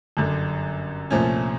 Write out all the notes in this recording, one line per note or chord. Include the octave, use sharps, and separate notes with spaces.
G1 F#2 D3
C2 A#2 F3 A3 C#4